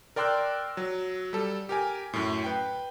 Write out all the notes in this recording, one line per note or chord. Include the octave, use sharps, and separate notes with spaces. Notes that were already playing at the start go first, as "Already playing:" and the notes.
A#4 D5 G5 C6 E6 F#6
F#3
G3 A4
G4 A#4 G#5
F#2 A2
B4 G5